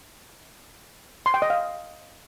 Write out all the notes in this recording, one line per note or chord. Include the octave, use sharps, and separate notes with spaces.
C6
G5
D#5
F5